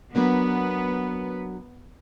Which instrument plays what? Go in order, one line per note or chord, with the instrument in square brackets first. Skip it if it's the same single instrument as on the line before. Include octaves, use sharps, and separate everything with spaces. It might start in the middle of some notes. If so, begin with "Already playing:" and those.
[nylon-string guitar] F#3 A#3 D4 [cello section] B3